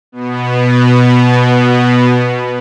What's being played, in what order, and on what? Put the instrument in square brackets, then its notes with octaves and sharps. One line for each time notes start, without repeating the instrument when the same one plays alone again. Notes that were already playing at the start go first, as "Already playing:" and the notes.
[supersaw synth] B2 B3